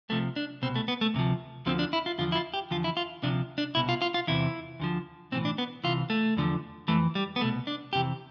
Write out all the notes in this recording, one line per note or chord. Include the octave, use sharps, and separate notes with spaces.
C2 C3 F3 A3
D4
C2 B2 C4
A3
B3
A3
D2 C3 F3
D2 D3 F3 C4
D4
E4
F4
E2 D3 F3 F4
E4
F4
G4
E2 D3 F3 F4
E4
F4
D2 C3 F3 D4
D4
C2 B2 E4
F4
F4
F4
E2 C3 E3 E4
D2 D3 F3
B1 A2 E3 C4
D4
B3
C2 C3 E3 F4
A3
E2 D3 F3
F2 E3 A3
G3
B3
C2 B2 A3
D4
F2 C3 E3 G4